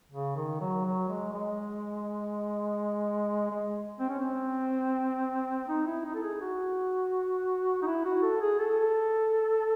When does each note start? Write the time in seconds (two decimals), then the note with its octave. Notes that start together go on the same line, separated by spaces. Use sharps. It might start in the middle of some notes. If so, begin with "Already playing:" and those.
0.11 C#3
0.36 D#3
0.61 F#3
0.85 F#3
1.09 G#3
1.33 G#3
3.50 G#3
3.99 C4
4.09 C#4
4.19 C4
5.68 D#4
5.87 E4
6.05 D#4
6.15 A4
6.23 G#4
6.41 F#4
7.82 D#4
7.86 E4
8.05 F#4
8.22 A4
8.41 G#4
8.59 A4